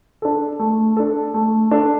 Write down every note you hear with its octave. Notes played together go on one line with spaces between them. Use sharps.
D4 A4
A3
D4 A4
A3
D4 A4